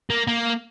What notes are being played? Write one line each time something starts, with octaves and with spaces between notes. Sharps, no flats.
A#3
A#3